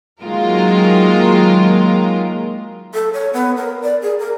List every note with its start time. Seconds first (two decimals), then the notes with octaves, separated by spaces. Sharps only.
0.23 D#3 F#3 G#3 A#3 F4 A#4
2.94 A4
3.13 C#5
3.33 B3
3.57 A#4
3.82 D5
4.02 G#4
4.19 A#4